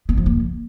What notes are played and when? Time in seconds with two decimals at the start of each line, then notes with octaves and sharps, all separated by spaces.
0.09 B3
0.17 F3
0.26 A#3